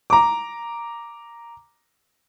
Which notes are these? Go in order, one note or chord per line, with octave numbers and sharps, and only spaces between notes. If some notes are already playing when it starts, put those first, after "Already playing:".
A#5 D6